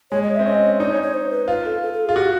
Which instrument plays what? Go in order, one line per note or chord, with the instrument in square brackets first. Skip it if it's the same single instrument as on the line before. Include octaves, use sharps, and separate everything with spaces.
[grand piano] G#3 [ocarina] C#5
[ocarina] D#5
E5
[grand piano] C4
[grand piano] C#4 [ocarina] D#5
[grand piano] D#4 [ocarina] D5
[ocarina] C#5
C#5
C5
B4
[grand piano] F4 [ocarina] B4
[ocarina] A4
A4
A4
G#4
[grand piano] F4
[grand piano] F#4 [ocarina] G4